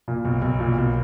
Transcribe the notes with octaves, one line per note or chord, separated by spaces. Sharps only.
A#2
B1
B1
A#2
B1